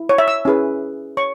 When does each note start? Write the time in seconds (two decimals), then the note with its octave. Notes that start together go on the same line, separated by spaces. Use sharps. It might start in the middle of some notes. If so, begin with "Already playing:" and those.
Already playing: E4
0.09 C#5
0.18 E5
0.28 E6
0.45 C#4 E4 G#4 B4
1.17 C#5 C#6